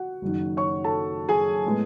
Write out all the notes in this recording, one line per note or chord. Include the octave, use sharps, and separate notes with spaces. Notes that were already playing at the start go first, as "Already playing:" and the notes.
Already playing: F#4 F#5
F#1 F#2 D#3
C#5 C#6
A4 A5
G#4 G#5
A2 G#3 B3